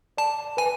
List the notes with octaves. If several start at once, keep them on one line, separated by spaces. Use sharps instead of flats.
D5 A5
B4 G#5